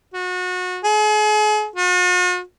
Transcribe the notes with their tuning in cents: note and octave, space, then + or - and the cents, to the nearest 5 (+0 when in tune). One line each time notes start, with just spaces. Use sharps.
F#4 -30
G#4 +40
F#4 -45